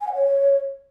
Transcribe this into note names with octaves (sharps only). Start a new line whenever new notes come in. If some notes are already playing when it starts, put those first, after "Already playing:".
G#5
F#5
C#5